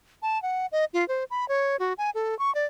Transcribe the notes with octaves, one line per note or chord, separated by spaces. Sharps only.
A5
F#5
D#5
F4
C5
B5
C#5
F#4
G#5
A4
C#6
D5